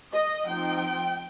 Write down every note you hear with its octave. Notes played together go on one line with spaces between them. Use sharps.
D#5
F3 C4 D#4 G5